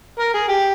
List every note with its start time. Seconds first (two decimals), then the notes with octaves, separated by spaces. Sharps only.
0.19 A#4
0.34 G#4
0.49 G4